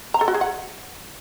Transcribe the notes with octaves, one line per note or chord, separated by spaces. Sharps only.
A#5
A4
F#4
G#4
F#5